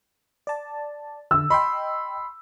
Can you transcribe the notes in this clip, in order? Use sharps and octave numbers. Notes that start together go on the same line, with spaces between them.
D5 A5
D3 E6
D#5 G5 B5 C6